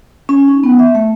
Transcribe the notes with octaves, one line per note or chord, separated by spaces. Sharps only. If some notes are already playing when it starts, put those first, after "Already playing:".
C#4
D#4
B3
E5
A3